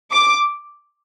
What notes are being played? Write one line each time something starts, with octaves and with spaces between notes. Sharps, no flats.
D6